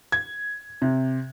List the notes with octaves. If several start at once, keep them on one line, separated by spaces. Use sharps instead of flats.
G#6
C3